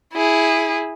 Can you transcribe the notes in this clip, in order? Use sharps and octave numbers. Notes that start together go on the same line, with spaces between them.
E4 G#4